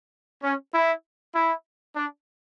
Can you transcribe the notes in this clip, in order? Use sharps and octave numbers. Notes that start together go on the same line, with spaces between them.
C#4
E4
E4
D4